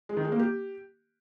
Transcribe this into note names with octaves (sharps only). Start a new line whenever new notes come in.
G#3
D#3
G#3
A#3
G4